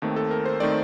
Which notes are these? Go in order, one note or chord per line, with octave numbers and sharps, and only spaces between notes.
D#2 D#3 A3 C4
A4
A#4
C5
D#3 A3 C4 D5